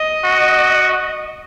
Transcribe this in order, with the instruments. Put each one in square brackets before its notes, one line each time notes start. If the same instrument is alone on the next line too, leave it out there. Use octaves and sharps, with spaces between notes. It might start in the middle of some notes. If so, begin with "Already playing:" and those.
Already playing: [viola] D#5
[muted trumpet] F#4